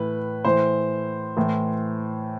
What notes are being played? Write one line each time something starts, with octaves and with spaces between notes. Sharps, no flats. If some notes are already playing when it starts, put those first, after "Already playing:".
Already playing: A2 E3 B4
A2 E3 C5
A2 E3